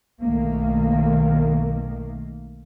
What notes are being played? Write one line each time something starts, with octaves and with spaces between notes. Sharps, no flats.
B1 D#3 A3 A#3